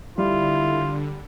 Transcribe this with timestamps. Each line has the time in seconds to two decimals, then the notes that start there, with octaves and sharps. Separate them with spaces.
0.18 D3 G3 E4 F4